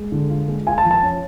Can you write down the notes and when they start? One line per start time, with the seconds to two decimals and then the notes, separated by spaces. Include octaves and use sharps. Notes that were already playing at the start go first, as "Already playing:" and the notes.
Already playing: G#3
0.12 D3
0.30 F4
0.48 G#3
0.67 F4 G#5
0.78 A5
0.85 F3
0.91 A5
1.03 C#4